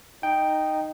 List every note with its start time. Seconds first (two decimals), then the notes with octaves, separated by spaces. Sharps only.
0.23 D#4 G5